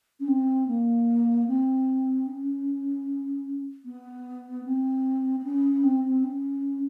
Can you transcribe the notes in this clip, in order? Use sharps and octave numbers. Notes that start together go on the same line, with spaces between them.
C#4
C4
A#3
C4
C#4
B3
C4
C4
C#4
C4
C4
C#4